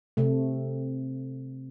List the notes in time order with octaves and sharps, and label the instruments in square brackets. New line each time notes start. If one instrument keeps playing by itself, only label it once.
[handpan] C3 A3